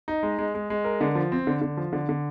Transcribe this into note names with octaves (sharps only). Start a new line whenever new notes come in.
D#4
G#3
G#3
G#3
G#3
A#4
D3
F3
C4
D3
D3
F3
D3
D3